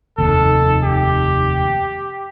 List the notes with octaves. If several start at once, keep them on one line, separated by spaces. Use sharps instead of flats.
F1 D#2 A4
G4